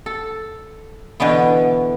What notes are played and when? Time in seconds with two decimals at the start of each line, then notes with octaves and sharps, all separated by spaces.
0.06 A4
1.20 B2 D3 E3 B3